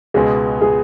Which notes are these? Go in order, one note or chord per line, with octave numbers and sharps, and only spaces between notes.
C#2 B2 G#3 B3 G#4
G#4